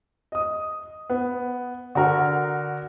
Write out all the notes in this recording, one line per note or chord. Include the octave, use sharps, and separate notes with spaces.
D#5 D#6
B3
D3 F#4 A#4